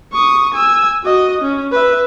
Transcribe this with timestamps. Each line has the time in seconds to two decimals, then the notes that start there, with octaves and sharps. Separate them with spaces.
0.13 C#6 D#6
0.54 G#5 E6
1.04 F#4 D#5
1.41 C#4
1.72 B4 E5